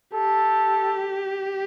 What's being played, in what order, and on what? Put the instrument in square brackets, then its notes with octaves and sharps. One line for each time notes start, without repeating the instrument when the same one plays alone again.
[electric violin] G4 [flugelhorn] A4